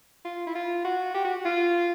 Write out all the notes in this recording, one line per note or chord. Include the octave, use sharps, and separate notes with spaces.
F4
E4
F4
F#4
G4
F#4
F4